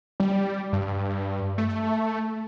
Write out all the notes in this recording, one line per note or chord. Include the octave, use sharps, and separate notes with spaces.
G3
G2
A3